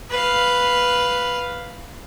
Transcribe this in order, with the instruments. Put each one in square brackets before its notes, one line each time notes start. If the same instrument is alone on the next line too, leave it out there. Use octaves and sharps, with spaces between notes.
[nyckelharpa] B4 F5